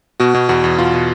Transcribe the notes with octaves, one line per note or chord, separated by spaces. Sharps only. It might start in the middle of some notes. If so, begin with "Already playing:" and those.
B2 F#4
B2
E2 F#4
E2
B2 F4
B2